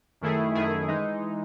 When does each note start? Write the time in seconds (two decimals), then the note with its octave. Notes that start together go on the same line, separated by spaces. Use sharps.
0.21 F#2 D#3 A3 E4 G#4
0.55 F#2 D#3 A3 E4 G#4
0.88 E3 G#3 D#4